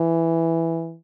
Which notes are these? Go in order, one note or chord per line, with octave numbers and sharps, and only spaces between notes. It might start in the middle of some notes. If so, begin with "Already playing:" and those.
Already playing: E3